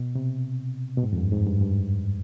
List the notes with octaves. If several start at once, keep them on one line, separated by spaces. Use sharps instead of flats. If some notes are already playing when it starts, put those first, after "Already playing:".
Already playing: B2
C3
B2
G#2
F2
G2
G#2
G2
G2